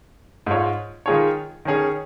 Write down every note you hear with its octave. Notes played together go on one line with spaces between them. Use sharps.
G#2 G#3 F4 C#5
D#3 G#3 F4 G#4 C#5
D#3 C#4 G#4 C#5